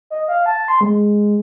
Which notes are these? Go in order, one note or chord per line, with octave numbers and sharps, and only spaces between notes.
D#5
F5
A5
C6
G#3